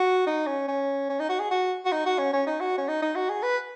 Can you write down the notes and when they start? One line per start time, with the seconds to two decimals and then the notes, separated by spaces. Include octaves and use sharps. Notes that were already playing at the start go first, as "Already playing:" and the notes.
Already playing: F#4
0.26 D#4
0.46 C#4
0.68 C#4
1.09 C#4
1.19 D#4
1.29 F#4
1.39 G#4
1.51 F#4
1.85 F#4
1.92 D#4
2.06 F#4
2.19 C#4
2.33 C#4
2.47 D#4
2.61 F#4
2.78 C#4
2.88 D#4
3.02 D#4
3.16 F#4
3.29 G#4
3.43 B4